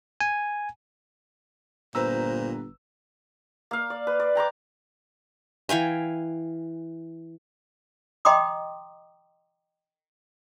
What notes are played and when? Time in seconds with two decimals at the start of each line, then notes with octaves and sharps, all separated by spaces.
0.21 G#5
1.95 G1 A#2 B4 C5 A#5 E6
3.71 A#3 F5
3.90 D5
4.07 B4
4.20 D5
4.35 G5 A#5 C6 D6
5.69 E3 F5 G5 G#5
8.25 D#5 G5 A#5 C6 D6 D#6